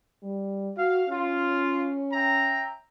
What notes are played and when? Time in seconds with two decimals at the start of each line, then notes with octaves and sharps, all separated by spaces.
0.23 G3
0.78 F#4 F5
1.09 C#4 F4
2.13 E5 G5 A#5